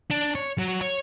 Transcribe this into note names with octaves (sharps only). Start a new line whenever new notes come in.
D4
C#5
F#3
C#5